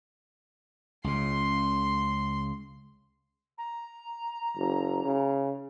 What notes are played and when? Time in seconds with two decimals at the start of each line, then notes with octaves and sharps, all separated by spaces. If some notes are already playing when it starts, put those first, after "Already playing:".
1.04 C#2 C#3 C6
3.58 A#5
4.56 F#1
5.05 C#3